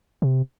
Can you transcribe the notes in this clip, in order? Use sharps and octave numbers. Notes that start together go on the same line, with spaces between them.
C3